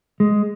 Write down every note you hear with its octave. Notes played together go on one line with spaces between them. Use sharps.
G#3